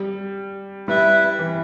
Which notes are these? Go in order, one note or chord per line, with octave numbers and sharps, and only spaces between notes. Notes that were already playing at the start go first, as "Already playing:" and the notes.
Already playing: G3
G3 E4 B4 E5
E3